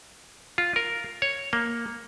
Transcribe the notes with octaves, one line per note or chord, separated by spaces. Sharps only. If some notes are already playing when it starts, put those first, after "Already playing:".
F4
A#4
C#5
A#3